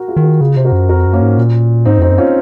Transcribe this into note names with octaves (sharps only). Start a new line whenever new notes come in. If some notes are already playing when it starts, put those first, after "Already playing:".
Already playing: F#4 A#4
F4 G#4
D#3
F#4 A#4
C#3 F4 G#4
C3 C5
F#4 A#4
F#2
F2 F#4 A#4
F#2
A#3 C#4
G#2
A#2
G#2 C4 D#4
F2 C4 D#4
F#2
C#4 F4